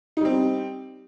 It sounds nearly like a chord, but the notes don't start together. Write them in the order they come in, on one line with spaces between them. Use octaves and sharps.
D#4 G3 C4